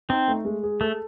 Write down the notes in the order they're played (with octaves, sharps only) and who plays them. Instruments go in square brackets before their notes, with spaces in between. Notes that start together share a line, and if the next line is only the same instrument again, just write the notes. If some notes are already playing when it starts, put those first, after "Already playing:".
[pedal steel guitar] C4 [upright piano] D#4
[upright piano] A3
G#3
G#4
[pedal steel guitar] A3 [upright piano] A4